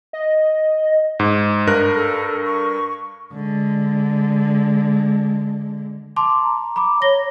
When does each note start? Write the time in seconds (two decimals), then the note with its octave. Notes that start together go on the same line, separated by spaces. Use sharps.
0.13 D#5
1.20 G#2
1.67 G2 A#4 F#6
1.95 A4
2.45 C#6
3.33 D3 G#3
6.16 A5 C6 D6
6.43 A#5
6.76 B5 D6
7.02 C#5 A#6 G7